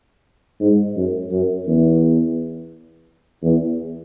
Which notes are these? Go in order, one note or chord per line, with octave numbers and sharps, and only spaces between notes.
G#2
F#2
F#2
E2
E2